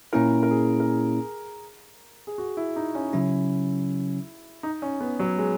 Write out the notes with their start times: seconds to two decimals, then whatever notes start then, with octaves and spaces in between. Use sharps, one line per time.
0.13 A#2 A#3 C#4 E4 A#4
0.43 A#4
0.51 G#4
0.80 A#4
0.88 G#4
2.27 G#4
2.38 F#4
2.57 E4
2.76 D#4
2.95 C#4
3.13 C#3 F#3 C#4 E4
4.63 D#4
4.82 C#4
5.01 B3
5.19 F#3
5.38 G#3